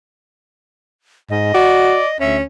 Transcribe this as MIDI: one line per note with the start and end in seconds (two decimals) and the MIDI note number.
1.30 1.52 44
1.30 2.17 75
1.54 2.00 66
1.54 2.08 74
2.20 2.42 38
2.20 2.43 61
2.20 2.37 76